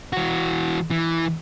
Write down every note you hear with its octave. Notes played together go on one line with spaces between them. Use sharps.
E3 F#4
E3